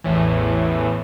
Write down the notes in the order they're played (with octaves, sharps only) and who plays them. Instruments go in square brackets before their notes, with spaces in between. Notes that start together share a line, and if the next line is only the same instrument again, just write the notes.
[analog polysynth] A1 E2 A2 E3